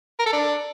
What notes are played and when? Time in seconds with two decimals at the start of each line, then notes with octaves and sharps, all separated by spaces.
0.19 A#4
0.26 A4
0.33 D4